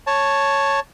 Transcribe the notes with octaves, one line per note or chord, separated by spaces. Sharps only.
C#5 A5